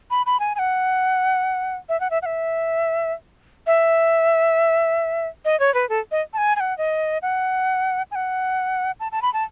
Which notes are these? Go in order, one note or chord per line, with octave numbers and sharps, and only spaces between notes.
B5
B5
G#5
G#5
F#5
E5
F#5
E5
F#5
E5
E5
D#5
C#5
B4
A4
D#5
A5
G#5
G#5
F#5
D#5
F#5
G#5
F#5
A5
A5
B5
A5